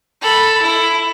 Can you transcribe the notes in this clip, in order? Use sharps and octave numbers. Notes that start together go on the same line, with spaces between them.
A4 B5
E4